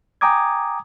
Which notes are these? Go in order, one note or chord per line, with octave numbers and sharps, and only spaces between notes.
G5 G#5 A#5 D6 D#6 G#6